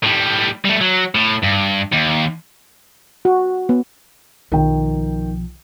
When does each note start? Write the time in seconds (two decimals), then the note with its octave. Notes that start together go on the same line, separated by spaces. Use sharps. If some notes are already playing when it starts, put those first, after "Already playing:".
0.03 A2 G3
0.65 G3 A3
0.81 F#3
1.15 A2
1.43 G2
1.92 D#2
3.25 F#4
3.69 B3
4.52 B1 D#3 F3 G5